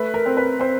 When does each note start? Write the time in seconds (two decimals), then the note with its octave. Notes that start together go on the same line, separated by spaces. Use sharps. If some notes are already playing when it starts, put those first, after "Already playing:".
Already playing: A3 B4
0.14 A#4
0.26 C4
0.37 B4
0.59 C4 C5